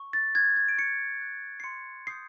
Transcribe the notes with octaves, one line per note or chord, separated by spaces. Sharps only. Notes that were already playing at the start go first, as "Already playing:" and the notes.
Already playing: C#6
A6
F#6 G#6
G#6
D7
C#6 C#7
F#6
C7
C6 C#7
D#6 G6 C7